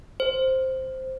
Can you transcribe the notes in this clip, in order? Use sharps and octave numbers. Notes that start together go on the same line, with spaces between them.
C5